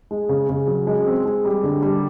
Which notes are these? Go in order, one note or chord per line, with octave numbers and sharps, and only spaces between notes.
G#3
C#3
C#3
F#3
G#3
C4
G#3
G3
D3
G3